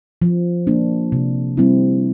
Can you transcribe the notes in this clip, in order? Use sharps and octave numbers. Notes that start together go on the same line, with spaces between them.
F3
A#3 D4
C3
G3 C4 E4